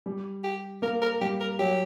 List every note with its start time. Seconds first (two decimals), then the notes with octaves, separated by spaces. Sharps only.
0.06 G3
0.44 G4
0.82 A#3 A#4
1.02 A#4
1.21 G3 G4
1.40 A#4
1.59 F#3 G4